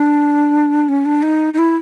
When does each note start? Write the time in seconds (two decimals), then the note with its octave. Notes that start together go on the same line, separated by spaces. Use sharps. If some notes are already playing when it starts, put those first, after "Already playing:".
Already playing: D4
0.89 C#4
1.06 D4
1.23 D#4
1.54 D#4
1.58 E4